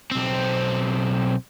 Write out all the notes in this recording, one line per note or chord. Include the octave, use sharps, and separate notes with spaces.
B1 C4